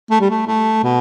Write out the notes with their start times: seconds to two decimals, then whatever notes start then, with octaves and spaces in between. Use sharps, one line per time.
0.11 A3
0.21 G3
0.30 A3
0.47 A3
0.84 B2